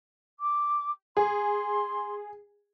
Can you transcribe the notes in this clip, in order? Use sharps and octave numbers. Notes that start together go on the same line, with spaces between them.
D6
G#4 C6